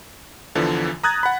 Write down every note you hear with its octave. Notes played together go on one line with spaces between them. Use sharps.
E2 D3 E3 F3
A#5 D#6 F#6 G#6 A6
F#5 B5